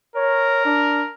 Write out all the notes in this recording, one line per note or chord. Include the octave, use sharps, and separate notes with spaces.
A#4 C#5
D4